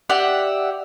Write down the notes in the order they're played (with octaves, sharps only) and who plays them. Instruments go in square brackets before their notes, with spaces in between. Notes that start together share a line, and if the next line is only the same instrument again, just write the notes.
[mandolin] G4 D5 E5 F#5